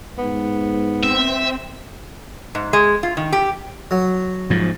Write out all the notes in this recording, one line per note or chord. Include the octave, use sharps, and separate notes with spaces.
G#2 B3
C4 E5
G#2
G#3
F4
D#3
G4
F#3
G#2 F3